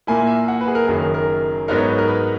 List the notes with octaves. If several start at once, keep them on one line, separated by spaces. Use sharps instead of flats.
A#2 A#3 E4 G#5
E5
F#5
B4
G#4
A#4
F#1 F#2 D#3 F#3 G#4
A#4
A#4
G#2 F#3 B3 D#4 A#4
C#5
B4
A#4
B4